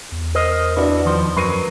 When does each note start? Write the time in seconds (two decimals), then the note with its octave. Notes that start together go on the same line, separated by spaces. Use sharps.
0.12 E2
0.35 A#4 C5 D#5
0.76 D4 E4 F#4 B4 D5
1.05 D#3 F3 C5
1.37 F#2 F#3 A#4 B4 C#6 C7 D#7